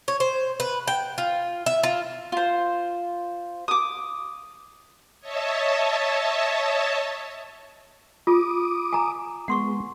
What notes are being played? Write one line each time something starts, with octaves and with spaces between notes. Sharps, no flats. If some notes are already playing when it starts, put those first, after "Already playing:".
C#5
C5
B4
G5
F4
E5
F4
F4 C5
D6 D#6
C#5 D#5 E5 A5
F4 D6 D#6
G#5 A#5
G#3 B3 F#5 C6 C#6